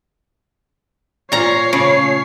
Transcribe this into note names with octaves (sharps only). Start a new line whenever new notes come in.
A#2 F4 C5 C#5 A#5 C7
C#3 A3 F4